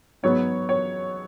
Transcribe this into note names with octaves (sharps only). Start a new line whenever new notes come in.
G#2 F#3 B3 C#5
C#5